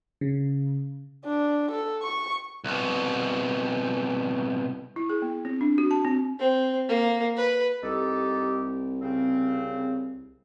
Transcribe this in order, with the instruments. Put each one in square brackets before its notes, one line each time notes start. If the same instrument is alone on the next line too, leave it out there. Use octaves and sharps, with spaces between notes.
[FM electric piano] C#3
[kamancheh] D4
A4
C#6
[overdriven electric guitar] C2 B2
[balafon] E4
G#4
B3
C4
D4
F#4
A5
C4
[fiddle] C4
A#3
B4
[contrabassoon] C2 [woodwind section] D#4 G4 A4
[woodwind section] C#3 C4